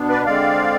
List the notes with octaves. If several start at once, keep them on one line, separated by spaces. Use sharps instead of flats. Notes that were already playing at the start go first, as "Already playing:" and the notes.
Already playing: B2 B3 D4
B4 D5
D3 G#3 C4 D5 F5